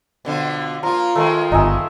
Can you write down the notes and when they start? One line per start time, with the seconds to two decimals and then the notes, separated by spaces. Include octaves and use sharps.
0.25 B2 D3 F3
0.83 F3 A#3 F4 A#5
1.15 D#3 F3 G#3 A3
1.52 G1 D#4 D#5 E5 G#5